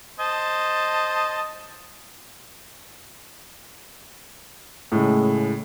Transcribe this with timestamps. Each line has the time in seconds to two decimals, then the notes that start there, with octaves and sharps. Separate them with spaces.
0.20 C5 D#5 A5
4.92 A2 C#3 G#3